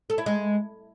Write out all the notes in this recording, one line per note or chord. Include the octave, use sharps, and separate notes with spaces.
A4
E4
G#3